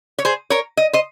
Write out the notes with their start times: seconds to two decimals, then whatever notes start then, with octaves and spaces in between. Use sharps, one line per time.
0.19 C#5
0.25 G#4 C5
0.50 A#4 C#5
0.77 D#5
0.93 C5 D#5